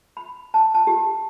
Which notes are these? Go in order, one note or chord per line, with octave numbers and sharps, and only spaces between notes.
B5
A5
A5
G4